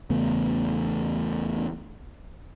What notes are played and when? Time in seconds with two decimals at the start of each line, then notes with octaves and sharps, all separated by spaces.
0.10 E2 C#3 A3 B3